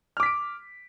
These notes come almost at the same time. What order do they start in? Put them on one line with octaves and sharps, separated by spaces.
F6 D6 B6 D7